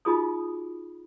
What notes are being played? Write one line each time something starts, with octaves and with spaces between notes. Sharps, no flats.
D#4 F4 F#4 G#4 B5 D#6